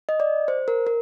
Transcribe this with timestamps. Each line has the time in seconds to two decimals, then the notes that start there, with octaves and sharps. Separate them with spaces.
0.09 D#5
0.20 D5
0.48 C5
0.68 A#4
0.87 A#4